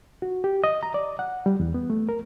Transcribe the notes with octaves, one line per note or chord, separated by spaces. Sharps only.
F#4
G4
D#5
A#5
D5
F#5
G3
E2
B3
A3
A#4